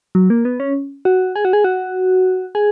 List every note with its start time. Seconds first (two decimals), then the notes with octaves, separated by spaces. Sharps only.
0.15 F#3
0.30 A#3
0.45 B3
0.60 C#4
1.05 F#4
1.36 G#4
1.45 F#4
1.53 G#4
1.64 F#4
2.55 G#4